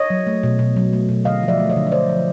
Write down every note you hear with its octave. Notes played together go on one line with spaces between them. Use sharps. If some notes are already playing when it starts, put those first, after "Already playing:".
Already playing: C#5 D#5
F#3
A3
B2
B2
F#3
A3
B2
D3 D#5 F5
F3
D5 E5
A3
C#5 D#5
D3
D#5
D3 C5 D5
F3